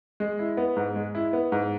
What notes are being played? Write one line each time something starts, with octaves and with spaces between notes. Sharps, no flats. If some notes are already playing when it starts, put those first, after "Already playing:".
G#3
E4
B3
G#2
G#3
E4
B3
G#2